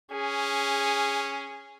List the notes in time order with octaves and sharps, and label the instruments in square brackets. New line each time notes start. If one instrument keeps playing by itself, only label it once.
[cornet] C#4 [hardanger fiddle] G#4